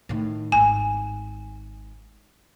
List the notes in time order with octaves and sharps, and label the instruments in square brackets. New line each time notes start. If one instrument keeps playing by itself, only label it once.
[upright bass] A2 D#3
[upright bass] G#1 [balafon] G#5